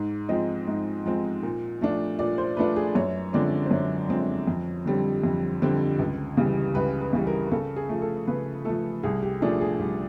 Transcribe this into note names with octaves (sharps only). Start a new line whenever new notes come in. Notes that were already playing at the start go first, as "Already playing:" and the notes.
Already playing: G#2
F3 G#3 C4 D#5
G#2
F3 G#3 C4
A#2
F3 A3 D4 F4
A#2 D5
C5
F3 A3 D4 F4 B4
G#4
F#2 C#5
D3 F3 G#3 C4 D5
C5
F#2 C#5
D3 F3 G#3 C4
F2
D3 G3 C4
F2
D3 G3 C4
C#2
C#3 E3 G3
C#2 B4
B4
C#3 E3 G3
A#4
C#3 A4
G#4
F3 A3
A4
C#3 B4
F3 A3 A4
C2 G#4
G4
A#2 F3 A3 D4 G#4
G#4
C2